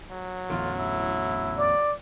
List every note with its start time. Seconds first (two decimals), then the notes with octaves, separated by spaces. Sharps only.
0.11 F#3
0.50 A1 E2 D3 F4
0.78 E4
1.58 D5